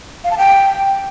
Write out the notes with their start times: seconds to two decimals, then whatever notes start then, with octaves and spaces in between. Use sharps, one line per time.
0.24 F5
0.31 A5
0.38 G5